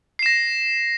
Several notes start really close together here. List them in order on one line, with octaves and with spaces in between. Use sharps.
C7 E7 A#6